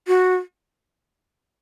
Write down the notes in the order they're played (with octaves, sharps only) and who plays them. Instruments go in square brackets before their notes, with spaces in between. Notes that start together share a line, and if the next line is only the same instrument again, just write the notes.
[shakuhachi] F#4